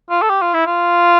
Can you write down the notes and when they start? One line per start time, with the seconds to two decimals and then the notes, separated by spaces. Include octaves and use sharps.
0.10 F4
0.22 A4
0.30 G4
0.41 F4
0.54 E4
0.66 F4